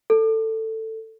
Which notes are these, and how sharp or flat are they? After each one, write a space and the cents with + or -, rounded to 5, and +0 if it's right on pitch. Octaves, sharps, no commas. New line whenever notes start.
A4 +15